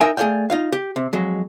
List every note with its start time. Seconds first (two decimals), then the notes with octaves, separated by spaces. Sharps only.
0.01 D#4 A#4 D#5 E5 G5 G#5
0.17 A3 G#4 A4 D5 F5 G5
0.50 D#4 F4 F5
0.72 G4
0.96 C3
1.13 F2 F#3 G#3